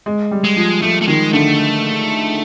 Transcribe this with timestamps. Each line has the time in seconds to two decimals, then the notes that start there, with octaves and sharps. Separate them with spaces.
0.06 G#3
0.31 G3
0.44 G#3
0.56 F3
0.82 F3 A3
1.02 A3
1.07 D#3 G#3
1.33 D3 A3